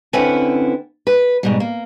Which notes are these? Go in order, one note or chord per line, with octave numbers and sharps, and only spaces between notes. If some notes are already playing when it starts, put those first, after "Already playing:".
D3 C4 C#4 E4 B4 F#5
B4
G#2 B2 G3
A#3